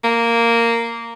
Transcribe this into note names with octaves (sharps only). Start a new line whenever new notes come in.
A#3